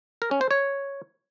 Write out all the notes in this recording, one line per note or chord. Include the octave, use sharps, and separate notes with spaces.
A#4
C#4
C5
C#5